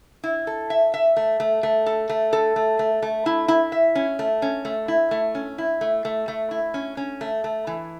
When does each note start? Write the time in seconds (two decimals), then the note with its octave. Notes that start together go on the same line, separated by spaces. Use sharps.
0.24 E4
0.47 A4
0.70 E5
0.94 E5
1.17 A3
1.40 A3
1.63 A3
1.86 A4
2.09 A3
2.33 A4
2.56 A3
2.79 A3
3.02 A3
3.26 E4
3.48 E4
3.72 E5
3.95 C#4
4.19 A3
4.42 C#4
4.65 A3
4.88 E4
5.11 A3
5.35 C#4
5.58 E4
5.81 A3
6.05 A3
6.28 A3
6.51 E4
6.74 C#4
6.97 C#4
7.21 A3
7.44 A3
7.67 E3